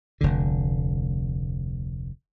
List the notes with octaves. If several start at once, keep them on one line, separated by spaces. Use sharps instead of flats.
F1 D2 D3